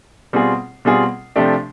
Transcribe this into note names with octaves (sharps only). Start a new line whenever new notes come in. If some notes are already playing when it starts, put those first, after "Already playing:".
B2 G3 C4 F4 G#4
B2 G3 C4 F4 G#4
C3 F3 A3 D4 G4